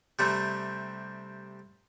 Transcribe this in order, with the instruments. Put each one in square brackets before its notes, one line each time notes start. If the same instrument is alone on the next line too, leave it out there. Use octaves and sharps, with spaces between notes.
[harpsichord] C3 G3 A3